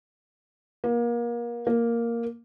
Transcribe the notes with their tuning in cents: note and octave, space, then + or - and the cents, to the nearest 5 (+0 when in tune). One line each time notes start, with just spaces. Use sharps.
A#3 +30
A#3 +0